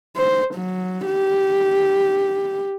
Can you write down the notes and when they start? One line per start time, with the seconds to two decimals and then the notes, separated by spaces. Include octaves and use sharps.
0.16 C5
0.55 F#3
1.06 G4